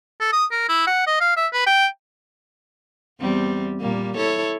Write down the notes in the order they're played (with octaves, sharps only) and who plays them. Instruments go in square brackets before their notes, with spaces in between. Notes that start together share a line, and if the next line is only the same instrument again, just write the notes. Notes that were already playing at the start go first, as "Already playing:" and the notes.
[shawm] A4
D#6
A#4
E4
F#5
D#5
F5
E5
B4
G5
[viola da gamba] E2 G3 C4
A#2 G3 A#3
E4 A4 C#5